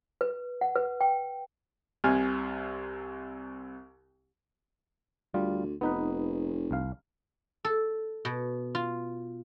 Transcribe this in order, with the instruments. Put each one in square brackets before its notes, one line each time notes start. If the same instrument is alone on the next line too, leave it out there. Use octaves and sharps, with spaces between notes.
[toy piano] B4
F#5
B4
G5
[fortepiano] C2 C3 G#5 F6
[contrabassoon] D2 [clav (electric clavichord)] G3 F4
[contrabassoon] F1 [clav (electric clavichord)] B3 D#4 B4
[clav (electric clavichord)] C2 F5
[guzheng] A4
B2
F4